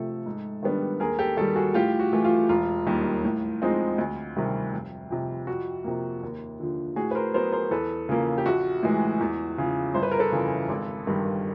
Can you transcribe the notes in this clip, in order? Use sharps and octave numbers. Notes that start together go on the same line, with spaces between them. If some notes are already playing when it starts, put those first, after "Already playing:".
Already playing: C3 F3 A3 A4
G#2
D#3 G3 B3 D4
D#2 G#4 A#4
G4 A4
D#3 G3 G4 A4
F#4 G#4
A2 F4 G4
F#4
E3 A3
F4
E1 F4
D#2 D#3 G3
A2
F3 G#3 C4 D#4
D2
C3 D#3 G3
F1
F2 C3 F3
F2 F#4
C3 F3 A#3
D#2
D3 F3
A2 F#4 G#4
B4
A#4 C5
F#3 B3 A#4 C5
A#4 C5
E2 A4 B4
C#3 F3 A#3
G4
A#1 F#4
A2 E3 G#3
E2
C#3 F3
G1 C5
B4
A#4
A4 B4
F2 C#3 E3
G#1
G2 D#3 G3